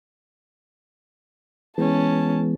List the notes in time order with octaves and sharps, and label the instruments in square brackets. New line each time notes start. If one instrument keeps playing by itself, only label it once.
[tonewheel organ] E3 G#3 B3 [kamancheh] C#4 A5